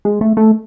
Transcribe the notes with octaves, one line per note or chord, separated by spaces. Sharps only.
G#3
A3
A3